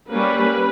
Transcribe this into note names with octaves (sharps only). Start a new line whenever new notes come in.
G3 A#3 C#4 B4